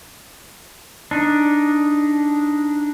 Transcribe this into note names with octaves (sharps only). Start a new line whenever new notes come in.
D4 D#4